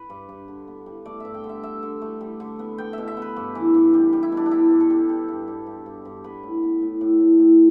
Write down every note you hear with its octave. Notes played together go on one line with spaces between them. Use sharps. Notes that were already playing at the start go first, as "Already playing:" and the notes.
Already playing: B4
G2
G2
D3
B3
G3
A3 D5
G2 E5
G5
D3
E5
D3 E5
D3
A3
G3
D3
B3
B3 G5
B2 E5
E5
B3 B4
G2
E3
G2
G3
G3
E4
B2 D4
D4
G3 E4
G2
A4
G3
G3
G2
G2
G2
G2
G2
B3 B4
A2
B3
A2
A2
A2
A2